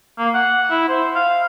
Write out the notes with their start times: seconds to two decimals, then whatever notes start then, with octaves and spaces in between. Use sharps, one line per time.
0.18 A#3
0.34 F#5
0.71 E4
0.88 C5
1.15 F5